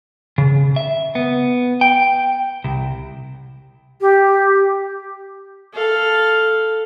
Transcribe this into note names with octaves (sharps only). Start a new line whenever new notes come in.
C#3
E5
B3
G5
C2
G4
A4 F5